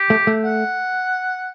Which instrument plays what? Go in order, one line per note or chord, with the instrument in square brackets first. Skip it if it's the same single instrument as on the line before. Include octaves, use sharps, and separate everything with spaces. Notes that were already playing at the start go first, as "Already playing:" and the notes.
Already playing: [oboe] G4
[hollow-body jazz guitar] A3
A3
[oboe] F#5